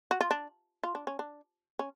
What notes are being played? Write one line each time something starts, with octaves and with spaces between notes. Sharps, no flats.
F#4
F4
D4
F4
D4
C#4
D4
C#4